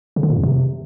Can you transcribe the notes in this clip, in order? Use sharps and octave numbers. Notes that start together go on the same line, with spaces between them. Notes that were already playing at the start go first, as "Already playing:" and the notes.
C#3
D3
A#2
F2
C3